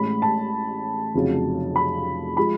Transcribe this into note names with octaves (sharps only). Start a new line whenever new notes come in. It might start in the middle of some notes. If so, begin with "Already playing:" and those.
Already playing: A1 A2 G#3 B5
A5
F1 F2 C#3 F#3
B5
F3 G#3 B5